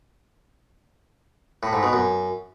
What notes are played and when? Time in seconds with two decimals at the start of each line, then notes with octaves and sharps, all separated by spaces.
1.63 A2
1.73 G#2
1.83 B2
1.93 F#2